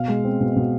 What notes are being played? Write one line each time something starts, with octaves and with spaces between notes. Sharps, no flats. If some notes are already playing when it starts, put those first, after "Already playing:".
Already playing: B2 F5
G#3
C4
B2
B2